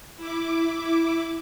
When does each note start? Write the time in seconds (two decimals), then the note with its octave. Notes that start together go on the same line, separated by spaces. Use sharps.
0.17 E4 D6